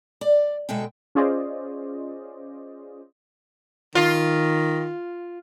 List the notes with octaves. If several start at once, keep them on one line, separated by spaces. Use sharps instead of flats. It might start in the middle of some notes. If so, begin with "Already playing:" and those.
D5
D2 B2 G#3 A4 E5 G5
C#4 F4 G#4 C5 D5 D#5
D#3 F4